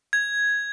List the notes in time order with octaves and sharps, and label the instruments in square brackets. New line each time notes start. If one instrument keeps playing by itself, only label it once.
[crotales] G#6